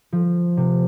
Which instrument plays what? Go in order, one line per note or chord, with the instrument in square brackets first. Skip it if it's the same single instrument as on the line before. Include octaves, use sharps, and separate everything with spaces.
[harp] F3
C3